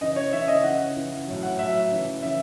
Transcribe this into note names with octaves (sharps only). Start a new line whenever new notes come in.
C#3 E3 D#5
C#5
C#3 E3 E5
D#5
E3 F#5
C#3
C#3 E3
A2 F#3
F#5
A2 F#3 E5
C#3 E3
C#3 E3 E5